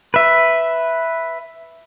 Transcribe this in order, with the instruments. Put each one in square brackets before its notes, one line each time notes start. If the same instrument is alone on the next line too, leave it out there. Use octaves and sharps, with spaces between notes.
[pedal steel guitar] B4 E5